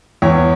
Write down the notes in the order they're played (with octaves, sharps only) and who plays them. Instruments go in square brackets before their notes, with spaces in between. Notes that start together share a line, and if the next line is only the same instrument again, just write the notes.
[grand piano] E2 C#5